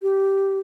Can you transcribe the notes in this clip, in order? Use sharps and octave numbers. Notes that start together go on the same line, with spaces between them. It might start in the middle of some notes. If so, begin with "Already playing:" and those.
G4